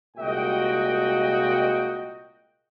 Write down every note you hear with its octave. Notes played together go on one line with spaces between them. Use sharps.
C2 A#2 G#3 F#4 D#5 G5